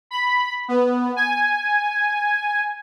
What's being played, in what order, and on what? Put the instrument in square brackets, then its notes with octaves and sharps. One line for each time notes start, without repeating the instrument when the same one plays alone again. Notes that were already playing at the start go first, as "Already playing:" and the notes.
[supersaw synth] B5
B3
G#5